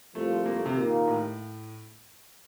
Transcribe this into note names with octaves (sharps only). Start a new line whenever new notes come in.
C2 A#2 F3 A3
A#3
A3
C3
D#2 A#2 D#3 A#3
A2